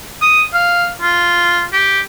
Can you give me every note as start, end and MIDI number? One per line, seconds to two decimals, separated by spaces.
0.22 0.43 87
0.53 0.89 77
1.02 1.65 65
1.73 2.01 67